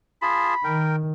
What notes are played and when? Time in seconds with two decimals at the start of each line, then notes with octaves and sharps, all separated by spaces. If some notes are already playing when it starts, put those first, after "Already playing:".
0.22 F4 G#4 A5 B5
0.64 D#3 A#4 G5